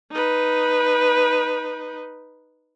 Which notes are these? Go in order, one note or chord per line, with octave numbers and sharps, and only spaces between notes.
D#4 B4